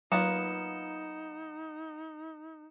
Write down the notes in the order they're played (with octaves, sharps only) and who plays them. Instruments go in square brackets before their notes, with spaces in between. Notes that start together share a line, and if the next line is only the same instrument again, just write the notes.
[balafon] F#3 [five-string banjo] A#3 B3 F4 [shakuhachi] D#4 [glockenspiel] C#7 E7